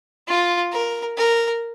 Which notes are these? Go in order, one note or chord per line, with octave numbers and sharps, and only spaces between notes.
F4
A#4
A#4